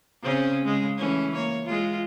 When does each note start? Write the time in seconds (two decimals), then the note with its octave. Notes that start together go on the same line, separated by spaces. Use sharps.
0.23 C#3 C4 C#4
0.65 C#3 G#3
0.98 E3 A3 C#4
1.33 A#3 C#5
1.66 G#3 F4